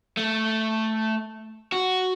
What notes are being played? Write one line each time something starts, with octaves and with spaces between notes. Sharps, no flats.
A3
F#4